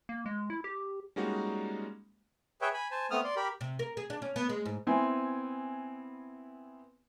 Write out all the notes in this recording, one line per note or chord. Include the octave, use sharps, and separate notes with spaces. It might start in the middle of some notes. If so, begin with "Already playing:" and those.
A#3
G#3
E4
G4
G3 G#3 A#3 C#4 D#4 F#4
G#4 B4 C#5 E5 G5
G#5 B5
C5 G#5 A5
A3 B3 C4 D#6 F6
D5 C6
G4 A#4 B5
C3
A#4
G#4
D4
C#4
B3
G#3
G#2
B3 C4 E4 G#5